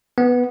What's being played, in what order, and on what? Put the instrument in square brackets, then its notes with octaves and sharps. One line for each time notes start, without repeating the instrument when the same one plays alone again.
[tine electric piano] B3